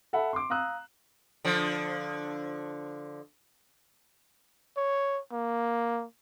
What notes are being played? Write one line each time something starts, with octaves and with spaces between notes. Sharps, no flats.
A4 E5 F#5 B5
C6 D6
F5 A#5 D#6 E6 F#6
D3 F3
C#5
A#3